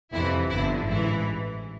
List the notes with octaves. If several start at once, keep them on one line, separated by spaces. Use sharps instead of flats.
F2 C3 E3 E4
G1 G2 D3 E4
A1 G#2 E3 E4